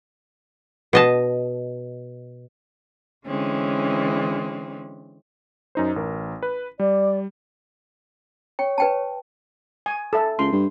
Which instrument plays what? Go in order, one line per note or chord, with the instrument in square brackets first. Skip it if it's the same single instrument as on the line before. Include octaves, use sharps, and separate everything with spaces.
[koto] B2 D#5 A5
[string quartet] D3 E3 G#3 C4 C#4
[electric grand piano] F#2 D#4 C5
A1 A#4
B4
[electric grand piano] G3 [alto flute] D5
[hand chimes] C#5 [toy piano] G5
[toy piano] B4 G5 A5
[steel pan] G#5
A4 E5
[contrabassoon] C#2 [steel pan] C6
[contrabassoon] G2